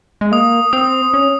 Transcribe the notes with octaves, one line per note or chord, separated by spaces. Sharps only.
G#3
A#3 D#6
C4 D#6
C#4